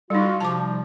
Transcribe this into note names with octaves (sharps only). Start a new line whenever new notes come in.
G3 D#4 F4 F#4
C3 F3 G3 A5 D6